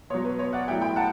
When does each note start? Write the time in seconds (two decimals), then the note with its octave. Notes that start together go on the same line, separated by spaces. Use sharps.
0.10 B2 C#5
0.14 F#3
0.25 B4
0.39 C#5
0.53 D5 F#5
0.68 A2 F#3 E5 G5
0.82 G5 B5
0.96 F#5 A5